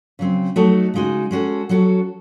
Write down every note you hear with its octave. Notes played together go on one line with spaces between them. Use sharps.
C#3 F#3 C4
F#3 A3 D#4 F#4 A4
C#3 G#3 D#4 F#4
G#3 C#4 F#4 A4
F#3 C#4 F#4 A4